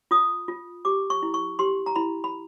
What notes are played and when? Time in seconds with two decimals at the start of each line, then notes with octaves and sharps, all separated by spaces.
0.11 F4 D#6
0.48 F4
0.85 G4 D6
1.10 C#6
1.23 E4
1.34 C#6
1.59 G4 C6
1.86 A#5
1.96 E4 B5
2.24 B5